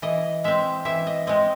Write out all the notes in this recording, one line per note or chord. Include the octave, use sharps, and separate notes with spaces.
E3 D#5
G#3 C4 E5
E3 E5
D#5
G#3 C4 D#5